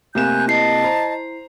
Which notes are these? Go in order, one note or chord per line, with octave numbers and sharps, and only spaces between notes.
C3 A3 A#3 G#5 F#6 G6 E7
E4 D#5 A5 C7
C5 A#5